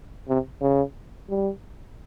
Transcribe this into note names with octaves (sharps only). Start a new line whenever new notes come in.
C3
C#3
G3